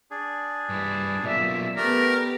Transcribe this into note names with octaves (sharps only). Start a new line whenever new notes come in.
D4 G#4
G2 E4
B1 A#2 D5 E5
A3 B3 G4 A4 A#4 D5